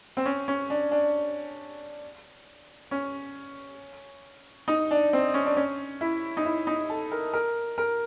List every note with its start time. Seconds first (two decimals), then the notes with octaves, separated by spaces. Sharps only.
0.17 C4
0.25 C#4
0.48 C#4
0.70 D4
0.91 D4
2.91 C#4
4.68 D#4
4.91 D4
5.13 C4
5.34 C#4
5.46 D4
5.57 C#4
6.01 E4
6.37 D#4
6.45 E4
6.67 D#4
6.90 A4
7.12 A#4
7.33 A#4
7.78 A#4